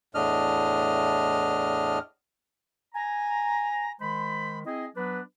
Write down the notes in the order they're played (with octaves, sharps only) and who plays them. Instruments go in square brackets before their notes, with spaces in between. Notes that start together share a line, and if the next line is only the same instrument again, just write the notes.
[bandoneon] E2 A2 D4 D#5 F6
[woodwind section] G#5 A#5
D#3 G#3 C5 B5
C4 E4 G#4 D#5
F#3 B3 D4 B4